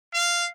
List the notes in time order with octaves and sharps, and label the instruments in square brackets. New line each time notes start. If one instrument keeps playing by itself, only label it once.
[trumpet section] F5